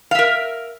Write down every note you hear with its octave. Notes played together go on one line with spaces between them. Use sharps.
A#4 E5 F5